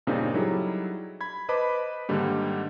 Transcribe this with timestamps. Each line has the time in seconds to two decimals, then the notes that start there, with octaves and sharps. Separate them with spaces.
0.07 G2 A#2 C#3 C4 D4 D#4
0.34 F#3 G3 D#4 E4 G#4 A4
1.21 B5 G#6
1.49 B4 C5 D#5 A5 B5 D6
2.09 G#2 D3 D#3 G3 A#3